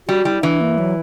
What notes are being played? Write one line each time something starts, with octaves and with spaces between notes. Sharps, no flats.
G3 F#4
G3 E4
E3 D4
A#3
F#3